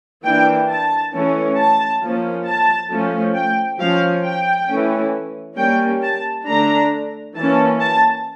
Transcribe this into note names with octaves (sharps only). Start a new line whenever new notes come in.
E3 A#3 D4 G5
A5
E3 A3 C#4
A5
F3 A#3 C#4
A5
F3 A3 C#4
G5
F3 C#4 F5
G5
E3 A3 C#4
G3 A#3 C#4 G5
A5
D3 A3 D4 A#5
E3 A#3 C#4 A5
A5